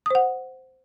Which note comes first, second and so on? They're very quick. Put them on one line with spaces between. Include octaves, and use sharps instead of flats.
D#6 C5 F#5